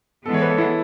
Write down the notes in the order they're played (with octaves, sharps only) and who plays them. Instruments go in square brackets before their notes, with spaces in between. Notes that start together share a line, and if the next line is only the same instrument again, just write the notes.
[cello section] E3 G#3 B3 [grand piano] A4
[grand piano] C#5
B4
A4
E4